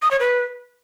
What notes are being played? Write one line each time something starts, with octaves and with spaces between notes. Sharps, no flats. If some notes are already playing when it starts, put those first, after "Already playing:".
D#6
C#5
B4